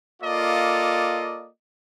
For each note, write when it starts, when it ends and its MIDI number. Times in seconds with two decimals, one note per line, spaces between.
0.22 1.48 58
0.22 1.48 65
0.22 1.48 69
0.22 1.48 74
0.22 1.48 75